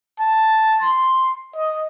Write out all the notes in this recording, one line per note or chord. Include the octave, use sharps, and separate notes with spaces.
A5
C6
D#5